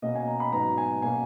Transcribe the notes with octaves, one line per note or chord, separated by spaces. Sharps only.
B2 A#3 C#4 D#5
G#5
A#5
B5
G#2 F#3 B3 A#5
G#5
B2 A#3 C#4 G#5